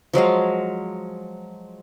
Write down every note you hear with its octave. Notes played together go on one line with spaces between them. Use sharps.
F3 F#3 G#3 F5